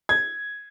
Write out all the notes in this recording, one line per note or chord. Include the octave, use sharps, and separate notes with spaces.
G#6